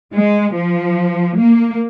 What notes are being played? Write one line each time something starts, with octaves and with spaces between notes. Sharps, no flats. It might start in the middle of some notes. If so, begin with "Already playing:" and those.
G#3
F3
A#3